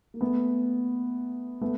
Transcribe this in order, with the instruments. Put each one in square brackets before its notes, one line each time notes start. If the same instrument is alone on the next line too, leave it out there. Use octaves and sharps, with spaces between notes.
[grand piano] A#3
A3 B3
A3 B3